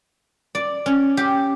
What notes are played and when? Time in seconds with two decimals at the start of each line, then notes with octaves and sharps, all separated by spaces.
0.55 D5
0.86 C#4
1.17 G4